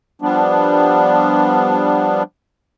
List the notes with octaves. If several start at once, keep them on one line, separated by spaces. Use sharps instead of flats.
F3 G3 B3 D4